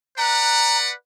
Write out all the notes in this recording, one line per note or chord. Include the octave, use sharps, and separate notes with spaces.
B4 D5 F#5 A#5